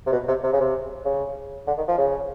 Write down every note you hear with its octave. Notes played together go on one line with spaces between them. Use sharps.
C3
B2
C3
C3
C#3
C3
C#3
D3
D#3
F3
C#3